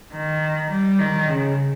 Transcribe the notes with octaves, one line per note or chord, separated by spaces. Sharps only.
D#3
G3
D#3
C#3